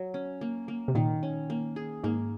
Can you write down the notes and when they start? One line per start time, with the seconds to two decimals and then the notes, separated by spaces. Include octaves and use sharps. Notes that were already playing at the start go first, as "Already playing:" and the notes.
Already playing: F#3
0.14 C#4
0.41 A#3
0.68 A#3
0.88 C3
0.95 A#2 D#3
1.23 C#4
1.50 A#3
1.76 G#4
2.03 G#2 A#3